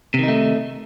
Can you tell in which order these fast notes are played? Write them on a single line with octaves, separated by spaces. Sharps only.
C3 D#3 D#4 A3